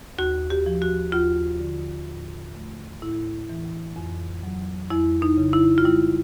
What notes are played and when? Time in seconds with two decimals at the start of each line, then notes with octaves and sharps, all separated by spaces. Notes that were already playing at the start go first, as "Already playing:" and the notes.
0.18 D#2 F#4
0.50 G4
0.66 F3
0.82 F#4
1.12 D#2 F4
1.59 D3
2.08 A2
2.55 A3
3.02 A2 E4
3.49 E3
3.96 F2
4.43 F#3
4.90 F2 E4
5.22 D#4
5.37 C#3
5.53 E4
5.78 F4
5.84 G3 E4